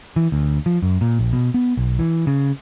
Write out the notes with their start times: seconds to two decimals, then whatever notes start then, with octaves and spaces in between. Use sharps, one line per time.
0.16 E3
0.32 D2
0.66 F3
0.83 F#2
1.01 A#2
1.19 A#1
1.33 B2
1.54 B3
1.77 B1
1.99 E3
2.27 C#3